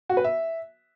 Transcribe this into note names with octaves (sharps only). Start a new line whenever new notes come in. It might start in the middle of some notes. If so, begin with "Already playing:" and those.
F#4
B4
E5